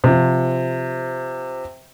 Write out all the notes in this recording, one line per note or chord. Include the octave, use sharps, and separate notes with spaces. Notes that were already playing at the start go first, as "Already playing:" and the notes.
C3 F3